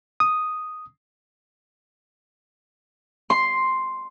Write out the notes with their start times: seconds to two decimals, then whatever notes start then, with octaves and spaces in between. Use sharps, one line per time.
0.20 D#6
3.30 C6